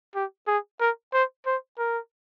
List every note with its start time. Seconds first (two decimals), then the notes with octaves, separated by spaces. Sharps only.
0.15 G4
0.47 G#4
0.80 A#4
1.13 C5
1.46 C5
1.78 A#4